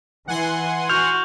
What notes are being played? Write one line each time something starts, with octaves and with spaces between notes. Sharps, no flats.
E3 F#5 G#5 C6
F#4 F6 G6 F7